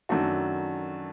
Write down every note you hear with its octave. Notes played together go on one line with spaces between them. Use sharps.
F#2 D#3 A3 D4 F#4